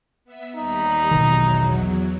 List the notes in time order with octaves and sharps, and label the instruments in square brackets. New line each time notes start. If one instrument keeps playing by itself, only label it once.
[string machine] B3 E5 B6
[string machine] D#2 G3 B5 [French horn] D#4
[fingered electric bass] A#1 B2 D#3 [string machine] E2 F#3